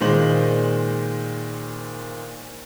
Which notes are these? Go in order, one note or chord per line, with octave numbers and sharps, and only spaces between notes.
A#2 D#3 G#3 C5 F#7